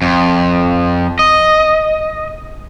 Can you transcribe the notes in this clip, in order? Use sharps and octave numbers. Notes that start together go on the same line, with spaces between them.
F2
D#5